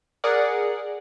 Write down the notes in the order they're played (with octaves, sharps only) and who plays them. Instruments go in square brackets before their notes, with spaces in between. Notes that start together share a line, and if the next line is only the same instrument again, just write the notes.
[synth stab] G#4 A#4 D5 F#5